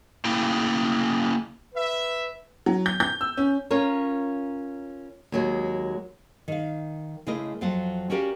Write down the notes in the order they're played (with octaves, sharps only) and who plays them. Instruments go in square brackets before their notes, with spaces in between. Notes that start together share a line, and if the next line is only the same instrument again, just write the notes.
[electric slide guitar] C#3 A#3 E4 G5
[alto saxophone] B4 [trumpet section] E5
[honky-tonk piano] F#3
G6
G6
E6
C#4
[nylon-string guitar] C#4 F4 A#4 C#5
D#2 F#3 G#3
D#3 F5
C#3 G#3 A3 E4 A#4 D#5
F2 F#3 F4 F5 F#5 A5
C#4 F#4 G4 A#4 D5 F5